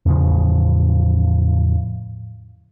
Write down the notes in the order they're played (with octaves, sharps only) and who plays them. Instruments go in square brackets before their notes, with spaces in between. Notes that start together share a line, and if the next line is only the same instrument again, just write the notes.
[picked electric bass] E2 A2 C#3 F3